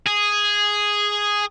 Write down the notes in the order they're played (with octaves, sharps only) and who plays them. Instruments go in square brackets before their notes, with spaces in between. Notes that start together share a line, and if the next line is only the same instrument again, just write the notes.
[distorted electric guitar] G#4